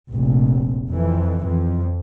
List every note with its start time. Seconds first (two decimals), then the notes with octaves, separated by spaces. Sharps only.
0.10 F1 A#1
0.90 F2 E3
1.50 F2